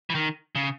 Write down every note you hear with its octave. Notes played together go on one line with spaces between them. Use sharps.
E3
D#3
C#3